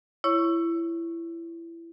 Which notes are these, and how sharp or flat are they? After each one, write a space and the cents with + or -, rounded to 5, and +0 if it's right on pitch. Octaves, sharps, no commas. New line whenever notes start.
E4 +20 C#5 +0 C#6 +0